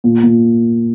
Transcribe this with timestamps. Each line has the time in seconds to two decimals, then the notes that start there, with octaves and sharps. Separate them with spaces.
0.04 A#2
0.23 A#2